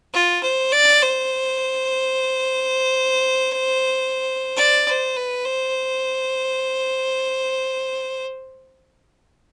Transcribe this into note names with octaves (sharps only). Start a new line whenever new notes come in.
F4
C5
D5
C5
D5
C5
B4
C5